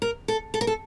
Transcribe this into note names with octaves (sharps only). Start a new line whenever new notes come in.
A#4
A4
A4
A#4
A4